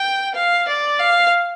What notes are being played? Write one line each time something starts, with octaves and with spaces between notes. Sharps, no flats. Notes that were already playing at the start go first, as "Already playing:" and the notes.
Already playing: G5
F5
D5
F5